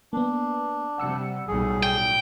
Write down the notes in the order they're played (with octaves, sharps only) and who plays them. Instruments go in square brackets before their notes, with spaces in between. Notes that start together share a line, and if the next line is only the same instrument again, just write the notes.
[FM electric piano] A#3 B3 [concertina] D4
[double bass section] C3 G3 [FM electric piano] F#5 E6 C#7
[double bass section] B1 A2 G3 [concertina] G#4
[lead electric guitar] G5